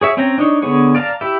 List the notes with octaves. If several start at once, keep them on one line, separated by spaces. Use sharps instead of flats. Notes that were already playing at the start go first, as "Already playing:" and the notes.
G#4 C#5 E5
C4 C#4 C#5 G5 A#5
D4 D#4 C#5
D3 B3 G#4 C#5
D5 F5 A5 A#5
E4 G4 E5